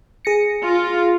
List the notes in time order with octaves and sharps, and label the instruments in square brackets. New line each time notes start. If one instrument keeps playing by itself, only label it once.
[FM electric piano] G#4 A#6 C#7
[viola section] F4